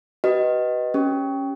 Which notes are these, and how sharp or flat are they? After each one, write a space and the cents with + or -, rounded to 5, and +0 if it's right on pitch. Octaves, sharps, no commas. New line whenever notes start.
F#4 +45 B4 -5 D#5 +5
C#4 -5 G4 +0